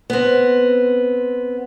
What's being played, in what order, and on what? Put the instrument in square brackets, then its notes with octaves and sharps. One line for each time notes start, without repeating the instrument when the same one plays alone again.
[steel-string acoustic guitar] B3 C4